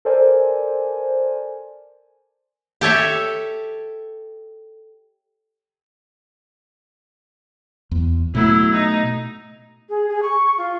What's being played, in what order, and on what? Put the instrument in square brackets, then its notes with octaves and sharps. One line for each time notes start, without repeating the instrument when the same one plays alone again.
[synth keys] A4 A#4 C5 D5 G#5
[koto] G4 A4 C#5 E5
[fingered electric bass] E2
[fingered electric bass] B2 A3 [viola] F#3 E4
[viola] D#4
[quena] G#4
G#4
C#6
F4